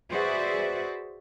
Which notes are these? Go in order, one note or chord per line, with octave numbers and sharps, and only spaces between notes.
F#4 G#4 B4 C5 D5 E5